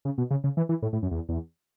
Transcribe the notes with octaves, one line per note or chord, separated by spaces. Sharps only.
C#3
B2
C#3
C#3
E3
E3
A2
A2
F#2
E2
E2